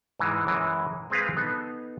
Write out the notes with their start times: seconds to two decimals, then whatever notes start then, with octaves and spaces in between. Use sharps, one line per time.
0.19 G#2 E3 G#3
0.47 F#2 E3 G#3
1.10 G#3 C4 G#4 B4 F5
1.37 B3 D#4 A4